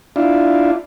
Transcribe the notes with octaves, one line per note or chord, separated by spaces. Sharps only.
D4 E4 F4